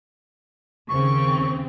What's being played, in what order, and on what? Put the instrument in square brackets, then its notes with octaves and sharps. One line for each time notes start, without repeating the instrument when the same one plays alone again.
[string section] D#2 C#3 C4 [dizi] C#6